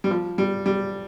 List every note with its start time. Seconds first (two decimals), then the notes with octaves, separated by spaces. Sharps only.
0.04 G3
0.10 F3
0.38 G3
0.66 G3